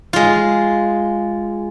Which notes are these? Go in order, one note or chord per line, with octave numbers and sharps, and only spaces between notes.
G#3 F4